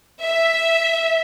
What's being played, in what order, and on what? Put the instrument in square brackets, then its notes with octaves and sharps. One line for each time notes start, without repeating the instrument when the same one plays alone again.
[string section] E5